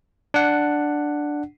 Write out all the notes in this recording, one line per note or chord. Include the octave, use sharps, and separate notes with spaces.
D4 F#5